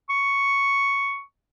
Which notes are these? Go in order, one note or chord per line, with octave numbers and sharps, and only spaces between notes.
C#6